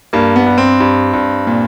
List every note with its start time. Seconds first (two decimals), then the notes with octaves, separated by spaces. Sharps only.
0.13 G2 A#3
0.36 B3
0.46 G2
0.58 C4
0.80 G2
1.14 G2
1.47 A#2